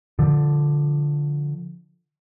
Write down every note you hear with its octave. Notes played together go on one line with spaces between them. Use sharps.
D3 F3